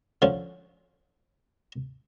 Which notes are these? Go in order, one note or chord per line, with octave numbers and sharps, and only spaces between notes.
D3 F3 C#4